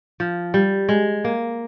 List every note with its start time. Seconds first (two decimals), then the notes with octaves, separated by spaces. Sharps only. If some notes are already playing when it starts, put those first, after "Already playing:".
0.20 F3
0.54 G3
0.89 G#3
1.25 A#3